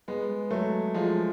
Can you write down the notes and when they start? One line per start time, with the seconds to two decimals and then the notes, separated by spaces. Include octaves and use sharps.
0.08 G#3 B3
0.51 F#3 A3
0.94 F3 G#3